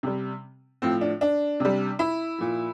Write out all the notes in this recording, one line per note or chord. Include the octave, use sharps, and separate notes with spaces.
C3 G3
A2 F3 C4
D4
D4
C3 G3
E4
A#2 F3